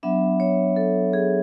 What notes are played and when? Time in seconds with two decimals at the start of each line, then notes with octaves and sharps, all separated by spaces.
0.03 F#3 B3 D4 E5
0.40 C#5
0.76 A4
1.13 G#4